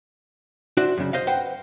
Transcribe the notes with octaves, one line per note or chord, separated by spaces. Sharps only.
D4 F#4 C5 E5
F#2 C#3
C5 D#5 F5
B4 C5 F#5 G5